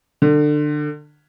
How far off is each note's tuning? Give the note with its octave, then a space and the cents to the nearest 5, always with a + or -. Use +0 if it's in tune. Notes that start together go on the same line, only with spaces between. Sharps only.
D3 +25